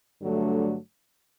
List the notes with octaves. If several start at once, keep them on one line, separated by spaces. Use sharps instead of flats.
G2 D3 F#3 A3 D4